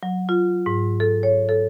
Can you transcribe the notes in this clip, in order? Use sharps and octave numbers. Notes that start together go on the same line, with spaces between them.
F#3
F4
G#2
A4
C#5
A4